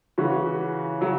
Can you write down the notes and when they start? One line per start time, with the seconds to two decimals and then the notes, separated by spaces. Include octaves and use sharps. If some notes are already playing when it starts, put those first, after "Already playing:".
0.18 C#3 E3 C#4 F#4
1.01 C#3 F#3